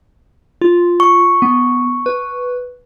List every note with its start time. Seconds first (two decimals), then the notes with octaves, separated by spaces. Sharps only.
0.62 F4
1.00 C#6
1.42 B3
2.06 B4